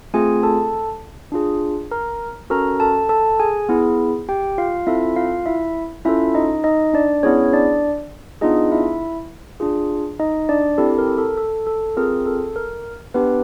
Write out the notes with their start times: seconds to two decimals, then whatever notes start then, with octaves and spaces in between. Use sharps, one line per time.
0.14 A3 C4 F4 G#4 G#5
0.43 A4 A5
1.32 D4 F4 G#4
1.91 A#4 A#5
2.50 C#4 F#4 A4 A#4 A#5
2.80 A4 A5
3.09 A4 A5
3.40 G#4 G#5
3.69 B3 E4 G#4
4.29 G4 G5
4.58 F4 F5
4.87 C4 E4 F4 A4 E5
5.16 F4 F5
5.46 E4 E5
6.05 C#4 E4 F4 A4 E5
6.34 D#4 D#5
6.64 D#4 D#5
6.94 D4 D5
7.23 B3 C#4 E4 G#4 C#5
7.53 D4 D5
8.41 B3 D4 D#4 F4 G#4 D#5
8.71 E4 E5
9.60 D4 F4 G#4
10.20 D#4 D#5
10.49 D4 D5
10.78 C4 E4 G4 A4
10.98 A#4
11.18 A4
11.38 A4
11.67 A4
11.97 C4 F4 G#4 A#4
12.26 A4
12.56 A#4
13.14 B3 D4 G4 B4